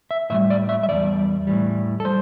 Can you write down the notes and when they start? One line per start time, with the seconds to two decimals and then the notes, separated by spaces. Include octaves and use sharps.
0.11 E5
0.30 A2 E3 G3 E5
0.50 D5
0.69 E5
0.83 E5
0.89 E2 C3 G3 D5
1.47 A2 E3 G3
2.00 A4
2.05 G3 C5